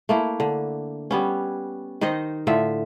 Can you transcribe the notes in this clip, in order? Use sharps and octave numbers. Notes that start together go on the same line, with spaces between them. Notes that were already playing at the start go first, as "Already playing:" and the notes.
A3 A#3 E4
D3
G3 B3 C#4
D#3 D#4 C5 D#5
A2 D3 F4 E5